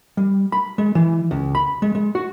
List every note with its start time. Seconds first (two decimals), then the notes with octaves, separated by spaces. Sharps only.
0.17 G3
0.52 B5
0.78 G#3
0.95 E3
1.31 C#2
1.55 B5
1.82 G#3
1.95 G#3
2.15 F#4